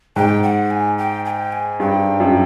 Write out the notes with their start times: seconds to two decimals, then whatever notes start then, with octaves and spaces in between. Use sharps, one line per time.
0.16 G#2 G5
0.43 F#5
0.71 G#5
0.98 G5
1.25 G#5
1.30 G5
1.52 G#5
1.80 G2 G5
2.20 F#2